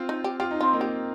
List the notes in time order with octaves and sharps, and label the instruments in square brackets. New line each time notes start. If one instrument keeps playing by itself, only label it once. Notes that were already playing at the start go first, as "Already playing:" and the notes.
Already playing: [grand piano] C4 F4
[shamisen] D#4
G4
[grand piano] F4 [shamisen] G4
[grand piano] D#4
[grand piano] C4 [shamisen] F4
[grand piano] A#3 D#4
[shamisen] G4